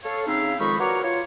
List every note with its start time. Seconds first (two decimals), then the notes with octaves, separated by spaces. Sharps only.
0.04 A4 C#5 F5
0.27 C#3 C4 D#4 E4 F5
0.60 F2 D#3 G#3 D#4 B5 C#6
0.80 F#4 A#4 B4 C#5 D5 A#5
1.03 F4 C#5